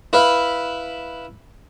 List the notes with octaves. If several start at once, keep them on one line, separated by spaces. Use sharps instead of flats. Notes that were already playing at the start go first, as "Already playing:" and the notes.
E4 B4 E5 F5